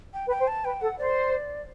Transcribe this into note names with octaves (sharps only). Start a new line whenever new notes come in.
G5
B4
G5
C5
A5
B4 G5
A4 F#5
C5 D5